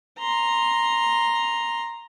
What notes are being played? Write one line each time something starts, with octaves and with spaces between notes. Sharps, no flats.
A#5 C6